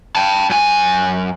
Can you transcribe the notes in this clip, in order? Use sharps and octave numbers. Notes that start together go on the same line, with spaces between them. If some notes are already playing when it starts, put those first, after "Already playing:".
G5 A5
F#2 G#5